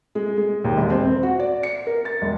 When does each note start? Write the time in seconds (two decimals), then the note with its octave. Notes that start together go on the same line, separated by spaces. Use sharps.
0.15 G#3
0.37 G#3
0.64 D#2
0.78 E1
0.90 C4
1.06 C4
1.23 F#4
1.40 D5
1.63 C#7
1.87 A#4
2.05 A6
2.22 E1